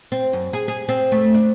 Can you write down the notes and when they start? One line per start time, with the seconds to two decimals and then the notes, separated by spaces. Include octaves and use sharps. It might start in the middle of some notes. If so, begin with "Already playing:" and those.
0.12 C4
0.33 F#2
0.53 G#4
0.68 G#4
0.89 C4
1.12 A3
1.34 D4